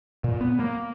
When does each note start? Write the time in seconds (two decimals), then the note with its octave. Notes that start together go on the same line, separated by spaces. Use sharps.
0.24 A#2
0.41 B3
0.59 A#3